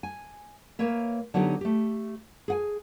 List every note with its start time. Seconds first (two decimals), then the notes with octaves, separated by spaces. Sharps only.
0.03 G#5
0.79 A#3 A#4 B4 C#5 E5
1.34 D3 F#3 B3 D#4 F4 G4
1.61 A3 G4
2.48 G#4 F#5 G#5